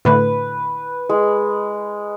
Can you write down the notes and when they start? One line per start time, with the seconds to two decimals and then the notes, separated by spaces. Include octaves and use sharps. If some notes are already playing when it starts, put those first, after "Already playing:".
0.05 A2 D3 A3 B4
1.09 G#3